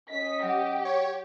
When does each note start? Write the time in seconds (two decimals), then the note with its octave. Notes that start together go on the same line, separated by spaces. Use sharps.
0.10 C#4 D#5 B6
0.43 F#3 G4 F#5
0.85 C#5